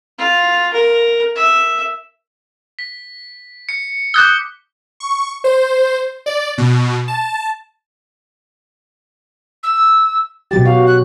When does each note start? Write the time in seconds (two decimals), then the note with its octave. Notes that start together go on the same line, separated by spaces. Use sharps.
0.19 F4
0.73 A#4
1.36 E5
2.79 B6
3.69 C#7
4.14 D6 D#6 F#6 G6 G7
5.00 C#6
5.44 C5
6.26 D5
6.58 B2
7.08 A5
9.63 E6
10.51 B2 F#3 G4 A6
10.65 F#4 F5
10.87 F#6